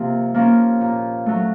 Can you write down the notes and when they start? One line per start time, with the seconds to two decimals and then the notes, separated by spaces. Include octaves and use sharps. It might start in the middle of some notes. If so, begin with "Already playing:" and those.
Already playing: C3 F3 A#3
0.34 F3 A#3 C#4
0.81 A#2
1.26 F#3 A3